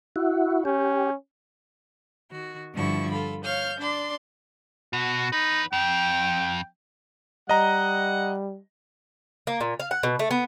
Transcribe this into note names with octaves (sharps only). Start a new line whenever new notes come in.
E4 F#4
C#4 G4
D#3 F#4
G2 D3 F3 E4 F4 C#6
F4 A4 B5
C#5 F5 F6 G6
D4 D5 C6
B2 F#4
E2 D#4 B4
F2 G5
G3 D#5 F#5 A#5
A#3
A#2
F5
F#5
B2
A3
B3